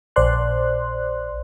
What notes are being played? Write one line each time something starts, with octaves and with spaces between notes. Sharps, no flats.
A#1 C5 D5 C6 F#6